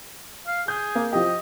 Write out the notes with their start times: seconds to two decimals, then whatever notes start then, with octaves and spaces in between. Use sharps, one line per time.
0.48 F5
0.68 G#4 G6
0.95 A#3
1.13 F3 G4 D#5